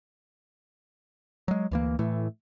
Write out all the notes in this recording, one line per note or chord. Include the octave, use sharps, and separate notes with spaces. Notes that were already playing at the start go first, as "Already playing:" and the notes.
F#3 G#3
D2 E3 A#3
A2 E3 A3